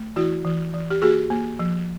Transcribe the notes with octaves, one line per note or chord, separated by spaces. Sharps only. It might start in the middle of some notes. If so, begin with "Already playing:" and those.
Already playing: A3
E3 E4 F#4
E3
E3
G4
A#3 F#4 G#4
A#3
F3